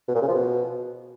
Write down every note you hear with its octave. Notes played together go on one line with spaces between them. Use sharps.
B2
A#2
C#3
F3
B2